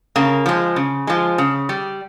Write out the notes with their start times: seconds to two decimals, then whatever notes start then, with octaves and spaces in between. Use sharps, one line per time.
0.16 C#3 A#3
0.46 F3 G#3
0.76 C#3
1.07 F3 G#3
1.38 C#3
1.69 G3